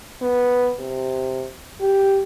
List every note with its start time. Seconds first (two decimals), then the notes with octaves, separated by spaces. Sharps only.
0.21 B3
0.79 C3
1.80 G4